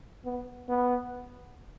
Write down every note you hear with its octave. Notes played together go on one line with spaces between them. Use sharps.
B3
B3